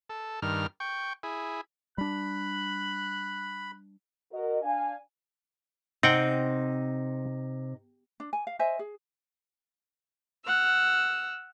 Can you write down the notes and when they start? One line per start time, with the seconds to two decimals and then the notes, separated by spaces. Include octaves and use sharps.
0.09 A4
0.42 G2 D#3 F6
0.80 G5 C#6
1.23 E4 G#4
1.98 G3 D4 B5 F#6
4.32 F#4 A#4 D#5
4.63 D4 F5 G#5
6.03 C3 C4 D#4 F#5 G5
8.20 D4
8.33 G#5
8.47 F5
8.59 C5 D#5 E5 G#5
8.79 G#4
10.45 F#5 E6 F6